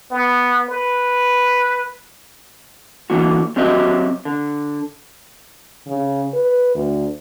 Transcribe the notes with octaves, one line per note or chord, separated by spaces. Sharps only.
B3
B4
D3 E3 A#3 D#4 F#4
F#3 C4 F#4 G4 D#5 E5
D3
C#3
B4
D2